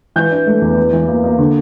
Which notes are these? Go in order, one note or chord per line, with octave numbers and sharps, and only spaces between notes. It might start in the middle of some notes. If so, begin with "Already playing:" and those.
E3 G6
D4
A3
E2
E3
E3
A#3
A#3
D3